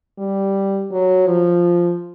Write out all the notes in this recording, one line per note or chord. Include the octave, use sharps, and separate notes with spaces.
G3
F#3
F3